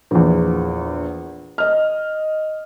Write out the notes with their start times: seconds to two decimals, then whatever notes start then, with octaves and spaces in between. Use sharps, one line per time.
0.11 A#1 E2
1.58 D#5 F6